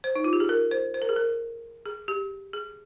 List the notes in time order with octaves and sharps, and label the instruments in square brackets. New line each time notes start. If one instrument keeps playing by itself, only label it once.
[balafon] C5
D#4
F4
G4
G#4
A#4
C5
C5
A#4
G#4
A#4
G#4
G4
G#4